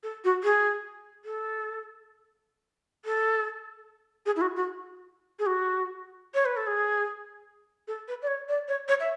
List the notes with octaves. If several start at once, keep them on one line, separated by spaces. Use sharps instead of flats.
A4
F#4
G#4
A4
A4
G#4
E4
F#4
F#4
G#4
F#4
C#5
B4
A4
G#4
A4
B4
D5
C#5
D5
C#5
C#5
E5